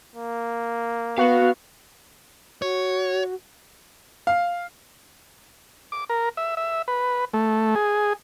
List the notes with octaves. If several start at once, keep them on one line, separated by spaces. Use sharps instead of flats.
A#3
B3 F#4 F5
F#4 C#5
F5
D6
A#4
E5
E5
B4
A3
G#4